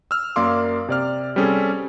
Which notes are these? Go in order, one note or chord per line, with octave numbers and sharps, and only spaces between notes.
E6 F6
F#2 A#3 D5 F5 C6 D6
C3 D5 F6
G3 C4 C#4 G#4 A4